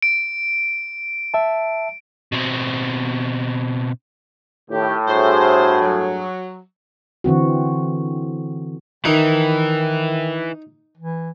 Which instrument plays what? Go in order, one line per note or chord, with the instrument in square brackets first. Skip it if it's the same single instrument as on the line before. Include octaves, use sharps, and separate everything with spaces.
[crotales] D7
[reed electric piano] E5 A5
[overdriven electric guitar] B2 C4
[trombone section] A2 [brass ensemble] D#3 G4
[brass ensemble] G2 F#4 G#4 [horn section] C5
[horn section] F#3
[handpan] D3 E3 C4 F#4
[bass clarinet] D#3 [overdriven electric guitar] E3 [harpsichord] D#4
[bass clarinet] E3